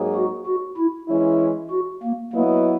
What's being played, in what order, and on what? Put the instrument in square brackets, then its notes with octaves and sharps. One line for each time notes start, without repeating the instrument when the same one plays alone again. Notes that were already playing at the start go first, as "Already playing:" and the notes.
Already playing: [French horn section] G#2 F#3 A#3 D#4 G#4
[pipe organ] F#4
F#4
E4
[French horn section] E3 G#3 C#4 E4
[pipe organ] F#4
A#3
[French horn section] F#3 B3 E4 B4 D#5 [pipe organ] A#3